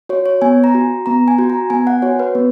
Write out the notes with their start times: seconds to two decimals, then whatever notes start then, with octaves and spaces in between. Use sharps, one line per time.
0.09 F#4 C#5
0.26 C#5
0.42 B3 G#5
0.64 A#5
0.75 F#4
1.06 B3 A#5
1.28 G#5
1.38 F#4
1.50 A#5
1.70 B3 G#5
1.87 F#5
2.02 F#4 C#5
2.19 B4
2.35 B3